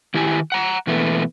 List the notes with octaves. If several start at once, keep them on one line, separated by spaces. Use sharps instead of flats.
D#3 E4 G4 G#5
F#5 A#5
B2 E3 A3 B3